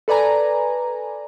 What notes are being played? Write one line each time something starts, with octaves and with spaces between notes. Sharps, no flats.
A4 B4 D5 G#5 A#5